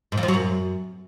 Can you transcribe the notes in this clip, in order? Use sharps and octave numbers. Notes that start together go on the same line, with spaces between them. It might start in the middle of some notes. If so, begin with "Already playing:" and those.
G#2
F2
F3
F#3
F#2